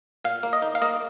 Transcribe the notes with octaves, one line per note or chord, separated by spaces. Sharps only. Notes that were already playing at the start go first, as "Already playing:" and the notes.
A#2 F5
A#3
D#5
D#4
F5
A#3 D#5